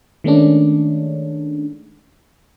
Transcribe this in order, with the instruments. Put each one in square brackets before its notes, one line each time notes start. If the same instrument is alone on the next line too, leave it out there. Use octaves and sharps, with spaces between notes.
[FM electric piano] D#3 G#3 A3 C#4 D4